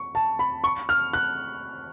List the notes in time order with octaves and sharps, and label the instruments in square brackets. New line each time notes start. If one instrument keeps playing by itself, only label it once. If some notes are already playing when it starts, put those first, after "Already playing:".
Already playing: [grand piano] C#6
A5
B5
C#6
F6
F#6